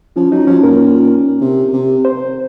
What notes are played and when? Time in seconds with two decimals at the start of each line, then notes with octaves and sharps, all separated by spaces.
0.16 F3 C#4
0.32 F#3 D#4
0.47 F3 C#4
0.63 A#2 A#4
1.41 C3
1.73 C3
2.05 C5